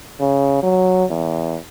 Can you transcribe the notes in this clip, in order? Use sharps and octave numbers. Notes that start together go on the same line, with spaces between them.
C#3
F#3
E2